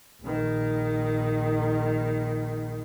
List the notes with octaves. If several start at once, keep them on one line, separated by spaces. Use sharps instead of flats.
A#1 D#3